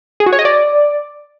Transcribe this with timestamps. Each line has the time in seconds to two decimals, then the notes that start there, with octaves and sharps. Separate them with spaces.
0.20 G#4
0.26 F#4
0.33 C#5
0.39 D#5
0.45 D5